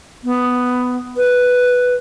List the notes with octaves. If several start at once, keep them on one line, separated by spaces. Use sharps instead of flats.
B3
B4